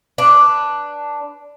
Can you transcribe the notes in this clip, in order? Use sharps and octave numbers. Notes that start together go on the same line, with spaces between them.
D4 B4